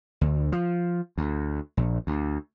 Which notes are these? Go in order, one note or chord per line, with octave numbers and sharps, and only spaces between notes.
D2
F3
D2
A#1
D2